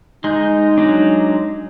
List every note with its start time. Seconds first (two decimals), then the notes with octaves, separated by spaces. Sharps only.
0.24 G#3 D#4 G6
0.78 F#3 G#3 D4